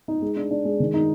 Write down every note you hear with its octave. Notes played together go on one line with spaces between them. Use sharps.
D#4
G#3
D4
D4
G#3
D#3
D#4